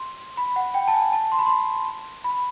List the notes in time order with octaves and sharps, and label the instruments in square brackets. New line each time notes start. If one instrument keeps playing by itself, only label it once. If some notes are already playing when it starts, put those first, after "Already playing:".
Already playing: [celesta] C6
B5
F#5
G5
A5
G#5
A5
C6
B5
C6
B5